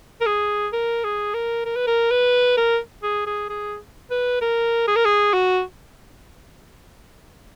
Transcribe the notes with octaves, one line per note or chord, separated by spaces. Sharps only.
A#4
G#4
A#4
G#4
A#4
A#4
B4
A#4
B4
A#4
G#4
G#4
G#4
B4
A#4
G#4
A#4
G#4
F#4